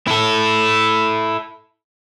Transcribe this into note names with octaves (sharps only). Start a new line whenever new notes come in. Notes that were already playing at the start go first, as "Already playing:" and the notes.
E4 A4